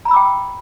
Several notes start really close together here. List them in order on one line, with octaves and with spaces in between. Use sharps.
A#5 B5 E6 D6 G5